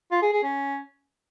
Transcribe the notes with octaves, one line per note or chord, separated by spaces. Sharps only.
F4
G#4
G#4
C#4